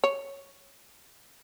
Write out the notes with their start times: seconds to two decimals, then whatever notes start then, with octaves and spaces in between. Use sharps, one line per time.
0.04 C#5